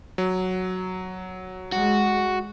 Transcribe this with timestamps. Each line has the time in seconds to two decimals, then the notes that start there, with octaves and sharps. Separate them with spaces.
0.18 F#3
1.72 G#3 F#4